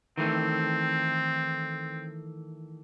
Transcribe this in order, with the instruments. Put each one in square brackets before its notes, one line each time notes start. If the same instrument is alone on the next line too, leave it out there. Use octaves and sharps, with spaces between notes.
[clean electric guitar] D#3 E3 A3 [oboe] C4